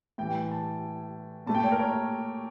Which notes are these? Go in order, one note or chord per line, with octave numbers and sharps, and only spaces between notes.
A2 E3 G3 G5
A5
A#2 A3 A5
G5
C#5
A#4
C#5